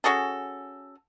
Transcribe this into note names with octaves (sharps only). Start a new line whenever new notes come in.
C#4 F#4 G#4 A4